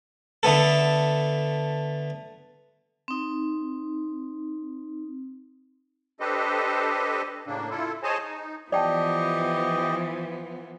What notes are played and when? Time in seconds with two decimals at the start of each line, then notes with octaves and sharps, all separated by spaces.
0.43 D3 A3 B3 A4
3.08 C4 D#4
6.20 D4 G4 A4 B4 C5 D#5
7.47 A2 C#3 A#3 D4
7.70 E4 F4 A4
8.03 G#4 C5 C#5 D#5 G#5 A5
8.24 D#4
8.72 E3 F3 B3 G4 D5 D#5 G5 A5